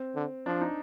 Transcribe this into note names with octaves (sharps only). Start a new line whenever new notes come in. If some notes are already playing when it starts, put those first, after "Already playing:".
Already playing: C4
D3
F3 D4
D#4